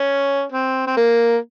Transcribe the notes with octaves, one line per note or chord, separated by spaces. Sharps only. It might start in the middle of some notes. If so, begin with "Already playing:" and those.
Already playing: C#4
C4
C4
A#3